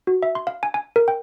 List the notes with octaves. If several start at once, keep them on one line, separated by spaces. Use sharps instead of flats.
F#4
E5
C6
F5
G#5
G#5
A#4
G5